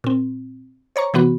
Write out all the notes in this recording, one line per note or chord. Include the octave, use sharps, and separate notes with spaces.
A#2 C4
C5 C#5 A#5 C#6
C3 E3 B3 F#4 B5